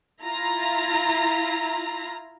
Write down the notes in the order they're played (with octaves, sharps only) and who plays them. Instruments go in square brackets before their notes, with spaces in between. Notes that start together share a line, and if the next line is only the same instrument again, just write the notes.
[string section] E4 F4 A#5